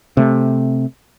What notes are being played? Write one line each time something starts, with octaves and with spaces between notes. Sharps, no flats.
C3 A3